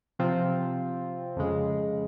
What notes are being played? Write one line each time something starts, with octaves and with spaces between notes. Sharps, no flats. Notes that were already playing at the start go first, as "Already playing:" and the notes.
C3 F3 C4 F4
F2 C#3 G#3